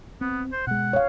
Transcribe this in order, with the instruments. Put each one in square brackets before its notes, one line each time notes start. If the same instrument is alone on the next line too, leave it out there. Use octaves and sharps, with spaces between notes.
[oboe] B3 [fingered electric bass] C4
[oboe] C5
[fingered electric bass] B2 G#3 [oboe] F#5
[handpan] C#5 F5